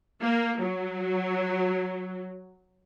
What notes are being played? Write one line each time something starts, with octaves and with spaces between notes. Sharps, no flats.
A#3
F#3